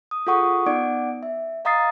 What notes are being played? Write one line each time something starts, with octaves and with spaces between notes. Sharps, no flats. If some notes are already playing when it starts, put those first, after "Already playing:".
D#6
F4 G#4 A4 F#5 C#6 D#6
B3 D#4 D5 F#5 D6 D7
E5
D#5 F5 A#5 D#6 A6 C7